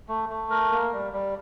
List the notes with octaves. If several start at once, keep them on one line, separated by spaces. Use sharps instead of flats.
A3
A3
A#4
A#3
G3
G3